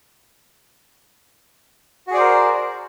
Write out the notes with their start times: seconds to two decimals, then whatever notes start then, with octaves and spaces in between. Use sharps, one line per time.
2.07 F#4
2.10 G#4
2.14 D5
2.17 C5
2.20 A#4